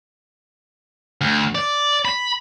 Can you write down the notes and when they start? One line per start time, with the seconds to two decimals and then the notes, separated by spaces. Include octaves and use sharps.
1.21 D2
1.55 D5
2.05 B5